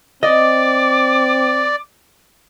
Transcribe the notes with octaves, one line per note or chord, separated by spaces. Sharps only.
C4 D5 D#5 D6